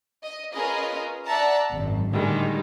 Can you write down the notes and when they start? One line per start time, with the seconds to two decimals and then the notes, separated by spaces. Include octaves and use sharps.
0.23 D#5
0.54 C#4 F4 G#4 A#4 B4 D#5
1.26 D5 E5 F#5 A5 A#5
1.71 G#1 F#2
2.11 A2 D3 D#3 G3 G#3